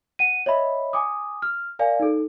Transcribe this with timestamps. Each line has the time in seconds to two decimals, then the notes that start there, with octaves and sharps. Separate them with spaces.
0.19 F#5 D#7
0.46 C#5 D#5 E5 B5
0.93 G#5 D6 D#6
1.42 F6
1.79 A#4 D5 F5 G#5
2.00 D#4 A4